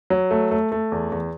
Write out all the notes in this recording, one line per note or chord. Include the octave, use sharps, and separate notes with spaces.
F#3
A3
A3
A3
E2
E2